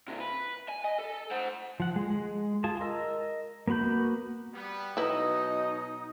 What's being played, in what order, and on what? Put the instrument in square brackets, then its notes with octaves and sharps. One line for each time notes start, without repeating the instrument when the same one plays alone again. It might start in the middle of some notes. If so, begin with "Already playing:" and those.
[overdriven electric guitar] C3 E3
B4
G#5
D#5
A4
C5 F#5
[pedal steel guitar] F3 F#5
G#3
G#3
F4 G#4 A5
A#4 D#5 E6
A#3 B3 F#4 B5 G6
[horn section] G3 B3
[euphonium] B2 [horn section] F#3 D#5 [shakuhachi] D#4 [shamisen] E4 B4